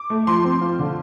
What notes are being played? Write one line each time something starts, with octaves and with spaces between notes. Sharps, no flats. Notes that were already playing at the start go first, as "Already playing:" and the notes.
Already playing: D6
A3
F3 C6
C4
F4
D3